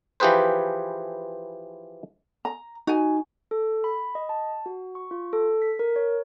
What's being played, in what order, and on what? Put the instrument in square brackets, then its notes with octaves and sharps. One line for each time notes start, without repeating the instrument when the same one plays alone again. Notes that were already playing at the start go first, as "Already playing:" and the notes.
[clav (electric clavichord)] E3 F3 G4 G#4 B4 C5
[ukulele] A#5
[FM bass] D#4 [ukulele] F#4 G#5
[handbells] A4
B5
D#5
A5
F#4
C#6
F4
A4
B6
A#4
C#5